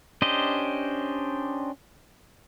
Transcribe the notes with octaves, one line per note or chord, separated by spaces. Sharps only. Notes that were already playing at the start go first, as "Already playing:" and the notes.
C#4 D4 G4 C5 D#5